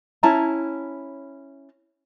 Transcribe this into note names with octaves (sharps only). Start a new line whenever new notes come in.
C#4 E4 A5 A#5